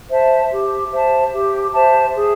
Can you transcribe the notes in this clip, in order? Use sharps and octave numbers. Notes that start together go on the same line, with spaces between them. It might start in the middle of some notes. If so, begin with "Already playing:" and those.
C5 E5 A5
G4
C5 E5 A5
G4
C5 E5 A5
G#4